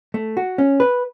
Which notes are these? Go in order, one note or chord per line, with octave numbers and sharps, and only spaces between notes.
A3
F#4
C#4
B4